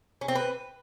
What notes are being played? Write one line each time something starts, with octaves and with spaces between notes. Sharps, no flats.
C#4
C4
B4